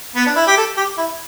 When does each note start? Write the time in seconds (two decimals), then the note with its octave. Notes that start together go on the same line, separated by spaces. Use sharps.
0.16 B3
0.27 D4
0.36 E4
0.47 G4
0.57 A4
0.77 G4
0.98 E4